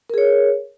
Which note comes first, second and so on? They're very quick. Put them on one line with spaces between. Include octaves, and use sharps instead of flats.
A#4 G#4 C#5